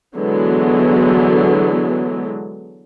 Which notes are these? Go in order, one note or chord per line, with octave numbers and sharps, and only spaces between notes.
D3 E3 F#3 G#3 B3